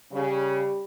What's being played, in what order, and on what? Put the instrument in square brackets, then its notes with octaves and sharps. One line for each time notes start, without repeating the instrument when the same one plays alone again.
[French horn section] C#3 [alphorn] G3